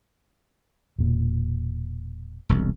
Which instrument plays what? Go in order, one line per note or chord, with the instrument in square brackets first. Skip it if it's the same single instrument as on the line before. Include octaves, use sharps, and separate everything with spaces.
[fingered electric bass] E1 A#2
[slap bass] E1 C2